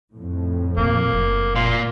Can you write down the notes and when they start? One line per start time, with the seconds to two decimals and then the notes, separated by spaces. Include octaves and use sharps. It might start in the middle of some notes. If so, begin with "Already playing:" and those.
0.14 F2 A2
0.77 A#2 D#3 A#3
1.12 F#1
1.56 A#2 F4